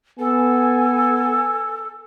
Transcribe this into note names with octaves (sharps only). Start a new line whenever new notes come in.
B3 A4 G#5